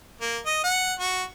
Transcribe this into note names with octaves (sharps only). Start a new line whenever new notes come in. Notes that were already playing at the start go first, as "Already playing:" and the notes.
A#3
D#5
F#5
F#4